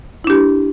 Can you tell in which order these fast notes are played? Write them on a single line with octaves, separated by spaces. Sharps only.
E4 D4 G4